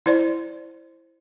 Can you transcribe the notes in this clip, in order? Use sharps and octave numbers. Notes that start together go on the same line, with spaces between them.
E4 C5 D5